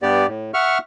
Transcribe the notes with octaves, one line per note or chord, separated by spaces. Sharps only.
G2 B3 G4 D5
A2
E5 F#5 C#6 F6